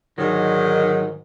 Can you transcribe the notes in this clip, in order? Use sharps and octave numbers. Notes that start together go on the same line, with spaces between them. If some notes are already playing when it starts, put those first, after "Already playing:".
G#2 D3 D#3 F#3